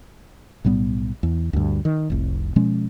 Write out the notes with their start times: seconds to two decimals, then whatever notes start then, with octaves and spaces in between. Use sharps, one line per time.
0.65 B1 A2 G3 B3
1.23 E2
1.53 D2 G2
1.85 D#3
2.10 F1 C2
2.56 B2 F3 G#3 C#4